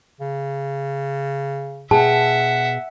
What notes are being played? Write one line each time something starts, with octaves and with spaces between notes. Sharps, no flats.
C#3
B2 G#4 E5 F#5 G5 A5